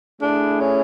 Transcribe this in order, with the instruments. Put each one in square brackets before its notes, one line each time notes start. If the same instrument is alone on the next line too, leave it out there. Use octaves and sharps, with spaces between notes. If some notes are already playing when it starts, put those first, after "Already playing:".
[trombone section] A3 E4 G#4 [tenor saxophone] D4
[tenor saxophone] C#4